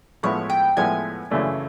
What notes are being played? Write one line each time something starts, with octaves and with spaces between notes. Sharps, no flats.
A2 F3 G#3 B3 E4 C#5
G5
A2 F3 G#3 B3 E4 G#5
F#2 C#3 E3 A3 D4